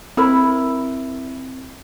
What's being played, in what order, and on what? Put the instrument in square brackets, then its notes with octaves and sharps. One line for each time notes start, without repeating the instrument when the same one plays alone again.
[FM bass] C4 [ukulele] E4 A#4 B5